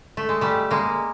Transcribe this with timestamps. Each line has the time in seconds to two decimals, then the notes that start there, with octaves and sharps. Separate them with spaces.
0.17 A3
0.29 G#3
0.41 G3 A3
0.71 G#3 A#3